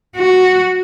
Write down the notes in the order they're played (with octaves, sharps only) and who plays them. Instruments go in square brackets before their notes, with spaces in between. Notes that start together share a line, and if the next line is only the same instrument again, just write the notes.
[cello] F#4